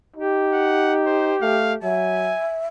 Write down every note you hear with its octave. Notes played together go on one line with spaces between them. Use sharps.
D#4 G4
F#5
C5
A3 F5
F#3 E5 G#5